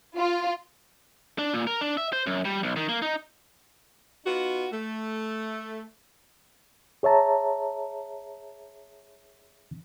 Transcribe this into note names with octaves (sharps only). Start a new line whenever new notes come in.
F4
D4
A#2
A#4
D4
E5
C5
F#2
G3
B1
D#3
A#3
D#4
B3 D#4 F4 F#4
A3
G#4 C#5 E5 A5 A#5